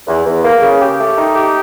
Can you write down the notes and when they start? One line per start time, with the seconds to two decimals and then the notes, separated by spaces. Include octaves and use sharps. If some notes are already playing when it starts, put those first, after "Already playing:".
0.07 E2
0.25 E2
0.43 A#3
0.62 C#3
0.79 G4
0.99 A3
1.17 D#4
1.35 G4